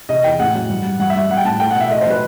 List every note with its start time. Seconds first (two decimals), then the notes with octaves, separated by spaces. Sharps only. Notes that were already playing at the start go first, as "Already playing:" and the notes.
0.09 C3 D#5
0.24 E2 G5
0.40 A2 F#5
0.55 F#3
0.70 G2
0.85 G3
0.99 G2 F#5
1.10 E5
1.15 G3
1.30 G3 F#5
1.37 G5
1.45 A2 A5
1.60 A3 G5
1.71 F#5
1.75 B2
1.80 E5
1.91 A3 D#5
2.01 C5
2.06 F#3 B4